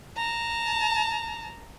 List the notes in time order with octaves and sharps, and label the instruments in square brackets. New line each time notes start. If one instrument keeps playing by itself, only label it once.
[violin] A5 A#5